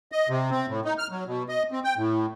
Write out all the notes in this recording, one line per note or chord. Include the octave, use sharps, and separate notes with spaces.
D#5
C3
C4
A2
D#4
F6
F#3
B2
D#5
C4
G5
A2